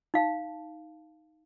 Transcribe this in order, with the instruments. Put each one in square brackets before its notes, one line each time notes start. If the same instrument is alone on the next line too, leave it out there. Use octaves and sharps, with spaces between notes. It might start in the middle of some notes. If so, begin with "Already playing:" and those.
[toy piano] D#4 F5 A5